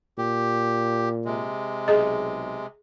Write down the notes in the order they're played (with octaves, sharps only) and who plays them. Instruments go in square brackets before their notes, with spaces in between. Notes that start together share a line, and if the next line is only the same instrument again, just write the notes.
[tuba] A#2 [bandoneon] G4
[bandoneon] C3 G#3
[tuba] B1 [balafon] G#4 D#5